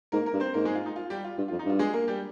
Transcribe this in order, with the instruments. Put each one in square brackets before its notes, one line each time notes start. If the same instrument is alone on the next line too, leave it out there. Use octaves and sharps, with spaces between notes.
[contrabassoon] G#2 [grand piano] A#3 A#4
[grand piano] A#3 A#4
[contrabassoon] G2
[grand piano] C4 C5
[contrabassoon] G#2 [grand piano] A#3 A#4
[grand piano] G#3 G#4
F4
D#4
F4
G3 G4
F4
[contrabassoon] G2
[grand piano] F4
[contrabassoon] F2
[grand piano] D#4
[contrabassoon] G2 [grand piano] F4
[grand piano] G#3 G#4
A#3 A#4
G3 G4